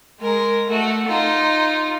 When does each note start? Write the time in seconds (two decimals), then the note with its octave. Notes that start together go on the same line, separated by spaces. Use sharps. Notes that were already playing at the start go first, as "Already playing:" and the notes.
0.21 G#3 A#4
0.69 A3 F#4
1.08 D#4 F4